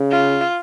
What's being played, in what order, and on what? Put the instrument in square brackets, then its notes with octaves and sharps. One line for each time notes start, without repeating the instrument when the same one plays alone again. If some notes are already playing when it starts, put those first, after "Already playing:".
Already playing: [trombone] C#3
[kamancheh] F4